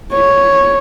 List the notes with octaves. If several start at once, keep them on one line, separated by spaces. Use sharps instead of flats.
C#5